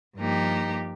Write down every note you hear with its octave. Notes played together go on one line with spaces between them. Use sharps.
G2 F3 A#3 D#4 G4